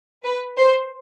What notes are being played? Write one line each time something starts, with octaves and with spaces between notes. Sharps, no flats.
B4
C5